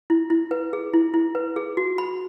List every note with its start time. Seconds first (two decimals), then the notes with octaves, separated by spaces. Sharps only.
0.10 E4
0.30 E4
0.51 B4
0.73 G#4
0.93 E4
1.14 E4
1.35 B4
1.56 G#4
1.77 F#4
1.98 B5